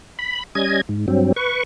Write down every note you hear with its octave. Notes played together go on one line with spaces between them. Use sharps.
B5
G3 C#4 D#5 G#6
G#2
G2 F#3 C4
B4 C#6